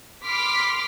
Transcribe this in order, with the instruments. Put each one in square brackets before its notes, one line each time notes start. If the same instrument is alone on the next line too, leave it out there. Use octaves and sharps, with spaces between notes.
[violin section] B5 C6 D6 F6 B6